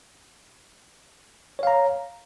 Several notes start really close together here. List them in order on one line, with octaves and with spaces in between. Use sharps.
C#5 F5 A#5